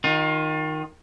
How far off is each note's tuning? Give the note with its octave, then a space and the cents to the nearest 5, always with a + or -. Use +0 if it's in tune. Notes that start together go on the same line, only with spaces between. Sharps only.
D#3 +0 F4 +30